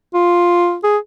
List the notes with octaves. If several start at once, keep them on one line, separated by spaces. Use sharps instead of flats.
F4
G#4